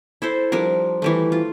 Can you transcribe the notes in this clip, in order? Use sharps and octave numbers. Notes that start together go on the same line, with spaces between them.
E4 A4 C5
F3 G3 D4 A#4
E3 G3 A3
F4